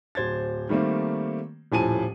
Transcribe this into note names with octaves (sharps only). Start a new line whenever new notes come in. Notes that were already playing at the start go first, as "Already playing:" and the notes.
D1 C5 G#6 A6
D#3 G3 A3 A#3 C4
D#1 A2 F3 G#5 A5 D#7